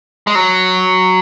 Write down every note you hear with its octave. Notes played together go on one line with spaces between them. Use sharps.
G#3
F#3